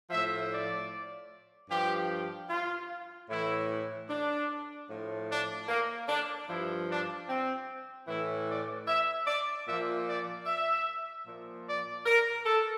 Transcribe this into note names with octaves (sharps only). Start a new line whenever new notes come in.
A2 F3 E5
D5
G2 F3 G4
F4
A2 E3 E4
D4
A2 F3
D4
A#3
D4
G2 F3 E4
D4
C4
A2 E3 E4
D5
E5
D5
A#2 F3 E5
D5
E5
A#2 F3
D5
A#4
A4